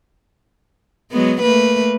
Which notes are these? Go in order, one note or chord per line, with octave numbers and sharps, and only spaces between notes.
F#3 G#3 B3
A3 A#3 B4